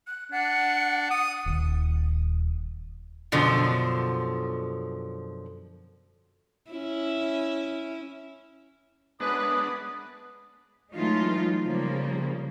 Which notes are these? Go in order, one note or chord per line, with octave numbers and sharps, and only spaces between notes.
F#6
D4 F#5
D#6
D#1 D#2
F#2 B2 D3 F3
C#4 E4
F#2 G#3 B3 D4 B4 D#6
E3 F#3 G#3 A3 D#4 F4
C#3 F3 G3 A#3